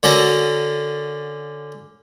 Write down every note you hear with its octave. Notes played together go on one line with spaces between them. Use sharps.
D3 C#4 F#4 A4 A#4